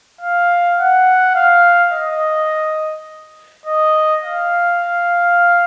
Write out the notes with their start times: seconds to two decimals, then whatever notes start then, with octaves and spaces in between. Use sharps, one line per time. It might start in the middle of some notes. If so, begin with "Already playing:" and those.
0.21 F5
0.79 F#5
1.35 F5
1.93 D#5
3.66 D#5
4.23 F5